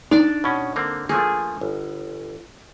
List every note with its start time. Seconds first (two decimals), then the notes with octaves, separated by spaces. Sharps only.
0.11 D4 D#4 D5
0.44 B2 C#4
0.76 D3 A#3 C4
1.09 F3 A3 A#3 G#4
1.61 G1